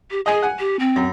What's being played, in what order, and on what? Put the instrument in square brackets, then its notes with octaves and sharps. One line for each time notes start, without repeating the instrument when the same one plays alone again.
[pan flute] G4
[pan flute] G#4 [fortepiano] D#5 G#5
[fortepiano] F#5 G#5
[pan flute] G4
C4
[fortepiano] F#2